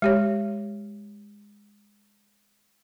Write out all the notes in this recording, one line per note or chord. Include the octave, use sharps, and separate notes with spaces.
G#3 G4 C#5